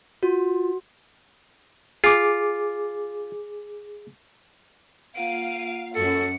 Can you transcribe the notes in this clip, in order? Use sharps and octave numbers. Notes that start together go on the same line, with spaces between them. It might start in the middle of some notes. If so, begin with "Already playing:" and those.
F4 F#4
F4 G#4 D6
A#3 F4 F5 F#5 D7 D#7
F#2 F#4 A4 C#7